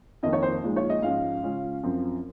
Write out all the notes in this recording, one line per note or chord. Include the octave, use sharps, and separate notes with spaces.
F2 D#3 A#3 D#5
C#5
C5
A#2 F3 G#3 D#4
C#5
D#5
G#2 F3 G#3 C#4 F5
C#3 G#3 C#4 F4
F#2 F3 C4